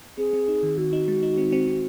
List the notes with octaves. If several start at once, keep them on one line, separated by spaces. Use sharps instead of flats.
C4 G#4
C4
D#4
D#3
D#3 F#4
D#4
G#3
D#4
C4
C4
C4